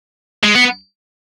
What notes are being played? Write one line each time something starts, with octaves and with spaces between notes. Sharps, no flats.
G#3
B3